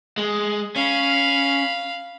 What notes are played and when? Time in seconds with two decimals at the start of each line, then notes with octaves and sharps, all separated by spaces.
0.18 G#3
0.76 C#4 F5 B5